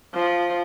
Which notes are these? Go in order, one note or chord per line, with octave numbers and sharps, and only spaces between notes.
F3